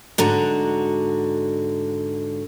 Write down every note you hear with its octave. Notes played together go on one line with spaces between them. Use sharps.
G#2 D3 F#4 A#5